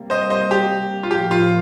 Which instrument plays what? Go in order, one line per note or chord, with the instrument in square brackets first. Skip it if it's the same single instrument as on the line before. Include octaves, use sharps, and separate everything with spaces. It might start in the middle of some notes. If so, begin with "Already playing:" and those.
Already playing: [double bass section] C3 G3 A#3
[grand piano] C5 D#5
C5 D#5
G4
F4
[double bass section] A2 F3 A#3 [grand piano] G4
[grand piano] F4